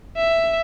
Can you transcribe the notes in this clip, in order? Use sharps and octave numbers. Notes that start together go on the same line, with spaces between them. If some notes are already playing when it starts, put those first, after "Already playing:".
E5